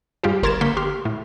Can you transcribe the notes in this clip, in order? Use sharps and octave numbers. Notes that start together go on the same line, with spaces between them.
G2 F4 G4 G#4
G1 A#4 C6 G#6 A6 E7
D2 A#3 C#6 G6 B6
G4 C6 F6
A2